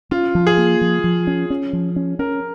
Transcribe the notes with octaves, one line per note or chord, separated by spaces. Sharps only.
C#4 F4
F3
G#4
A#3
F3
F3
C#4
C#4
F3
C#4
C#4 A#4